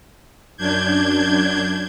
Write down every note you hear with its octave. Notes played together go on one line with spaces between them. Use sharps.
F#2 D4 G6 G#6